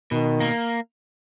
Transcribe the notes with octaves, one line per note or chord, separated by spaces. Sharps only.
B2 D#3
A#3